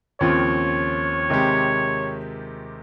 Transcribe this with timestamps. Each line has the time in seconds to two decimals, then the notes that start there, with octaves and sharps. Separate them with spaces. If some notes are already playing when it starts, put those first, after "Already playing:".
0.21 D#2 C#3 F3 C4 F4 C#5
1.30 C3 D#3 G#3 C4 G4